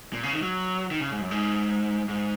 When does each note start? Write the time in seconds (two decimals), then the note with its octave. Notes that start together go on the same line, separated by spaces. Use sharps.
0.13 A#2
0.23 C#3
0.33 D#3
0.42 F#3
0.91 D#3
1.01 C#3
1.11 G#2
1.21 F#2
1.31 G#2
2.08 G#2